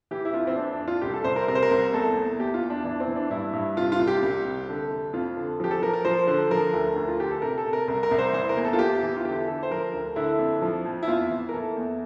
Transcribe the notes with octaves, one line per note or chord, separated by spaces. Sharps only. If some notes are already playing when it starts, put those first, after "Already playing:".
E3 G4
E4
F2 F4
C4
F2 D4
D4
F2
F4
C2 G4
A4
C2 C5
A#4
C3 A#4
C5
A#4
C2
E2 A4
E2
E2 G4
F4
E2
D4
E3 D4
C4
E3
D4
G2 E4
G2
C3 F4
F4
C2
G4
C2
C3
D3
F2
F2 F4
D3
F3 G4
A4
F3 A#4
A#4
F3 C5
D3
F3 A#4
D2
D2
F4
D3 G4
A4
C3 A#4
A4
C3
A#4
C2 A#4
A#4
C2
C5
E3 C5
A#4
E2
A4
F4
E2 G4
E3
F4
D3 G4
D3 A4
C5
F3 A#4
D2
D3 E4
F2
F3
F2
E4
E2 F4
E3
A#4
E3 A4
E2